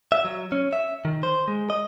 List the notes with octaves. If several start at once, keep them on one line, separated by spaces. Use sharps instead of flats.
E5
F#3
C#4
E5
D#3
C5
G#3
D#5